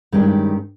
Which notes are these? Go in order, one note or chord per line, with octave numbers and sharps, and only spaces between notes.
G2 D#3 G#3 C#4 G4